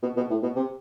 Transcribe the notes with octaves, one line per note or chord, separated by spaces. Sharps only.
B2
B2
A2
B2
C3